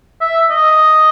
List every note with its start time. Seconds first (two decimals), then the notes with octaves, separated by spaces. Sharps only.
0.21 E5
0.50 D#5